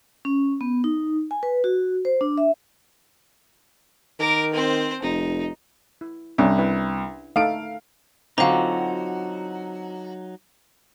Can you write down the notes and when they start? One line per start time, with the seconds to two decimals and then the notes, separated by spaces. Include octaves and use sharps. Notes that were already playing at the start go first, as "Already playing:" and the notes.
0.25 C#4
0.61 B3
0.84 D#4
1.31 G#5
1.43 B4
1.64 F#4
2.05 C5
2.21 D4
2.38 E5
4.19 D#3 A#4 D6
4.54 C4 C5
5.02 F1 D#4
6.01 E4
6.38 C2 C#4 D4
6.58 E4 B4 G5
7.36 A3 D#4 A4 F5 D7
8.38 D3 F#3 C4 D#4 F4 F#4 F5 A#5